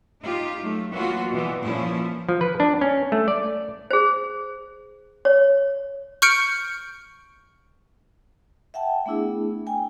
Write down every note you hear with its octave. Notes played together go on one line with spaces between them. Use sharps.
D#4 F4 G4
F#3 A3
E3 F#3 A#3 B3 F4 F#4
B2 E3 G3 B3
A#2 F3 C#4 E4
F3
B4
D4
C#4
A3
D5
G#4 C5
C#5
C#6 F6 G6 C#7 D7
E5 F#5 G5 A5
A3 B3 D4 E4 G#4
G5 G#5